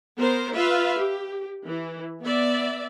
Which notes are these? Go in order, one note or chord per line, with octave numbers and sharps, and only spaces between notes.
B3 A#4 C5
F4 B4 E5 F5
G4
E3
B3 D5 E5